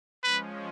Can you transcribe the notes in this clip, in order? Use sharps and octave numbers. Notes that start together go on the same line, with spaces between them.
F3 G#3 C#4 B4